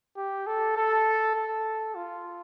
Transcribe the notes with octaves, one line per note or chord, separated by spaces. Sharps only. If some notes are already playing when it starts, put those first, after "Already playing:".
G4
A4
A4
A4
F4